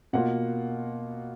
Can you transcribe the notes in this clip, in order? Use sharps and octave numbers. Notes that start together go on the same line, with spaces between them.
B2 A#3 F4 F#5